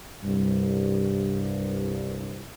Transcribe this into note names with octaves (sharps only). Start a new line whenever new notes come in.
C2 G2